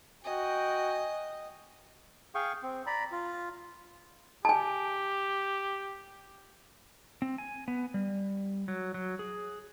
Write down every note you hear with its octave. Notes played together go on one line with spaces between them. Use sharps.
F#4 D#5 G5 G#5
G#4 F5 G5 C#6
C4
D5 A#5 B5
F4
G4 G#5 A5
C4
G#5
B3
G3
F#3
F#3
G#4